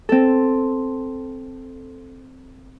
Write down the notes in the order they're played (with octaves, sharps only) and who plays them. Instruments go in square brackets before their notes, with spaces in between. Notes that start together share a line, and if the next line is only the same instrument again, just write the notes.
[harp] C4 A4